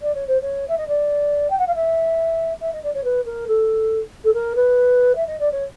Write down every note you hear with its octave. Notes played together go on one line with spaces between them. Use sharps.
D5
C#5
C5
C#5
E5
D#5
D5
G5
F#5
F5
E5
E5
D#5
D5
C#5
B4
A#4
A4
A4
A#4
B4
E5
D#5
D5
C#5